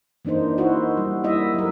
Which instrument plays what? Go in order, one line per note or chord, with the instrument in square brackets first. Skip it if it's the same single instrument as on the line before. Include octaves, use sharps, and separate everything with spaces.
[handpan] E3 A#3 D4 D#4 C5
D#4 E4 F#4 C5
G3
A#3 E4 D#5 E5
F#3 A#4